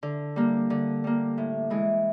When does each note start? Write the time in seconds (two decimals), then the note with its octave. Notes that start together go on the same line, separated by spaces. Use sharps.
0.03 D3
0.36 G3 A#3
0.70 D3
1.04 G3 A#3
1.38 A2
1.70 E3 G#3